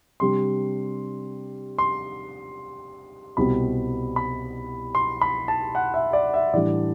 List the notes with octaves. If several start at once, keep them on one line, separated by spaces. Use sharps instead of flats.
C3 G3 D4 C6
C6
C2 B2 G3 C4 B5
B5
C6
B5
A5
F#5
E5
D5
E5
A2 E3 G3 D4 D5